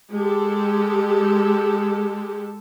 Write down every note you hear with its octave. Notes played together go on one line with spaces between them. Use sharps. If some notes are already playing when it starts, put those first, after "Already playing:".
G#3 G4 A4